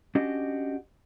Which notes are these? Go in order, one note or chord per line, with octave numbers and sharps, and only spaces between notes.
C#4 D4 F#4 G4 D#5